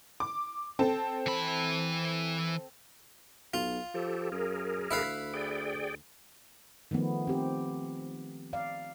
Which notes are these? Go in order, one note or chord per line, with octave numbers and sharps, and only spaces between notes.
D6
C4 A4 A5
E3 B5
B1 F4
F3 G4 A4
F#2 G#4 A#4
D2 E4 B4 F5
G#4 D5 G5
D#3 F3 A3 B3
C4 G4
D5 F5